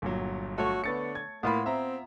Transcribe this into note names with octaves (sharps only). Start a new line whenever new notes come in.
G1 A#2 F#3
A3 F#4 C#5
D3 B3 A6 C#7
G#6
A2 A#3 B3 F4 B5
C4 E5 A#5